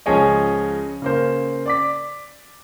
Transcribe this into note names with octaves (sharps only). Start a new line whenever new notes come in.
C#2 F3 C#4 G#4 C#5 D#5
C#3 A#3 C5
D5 D6 B6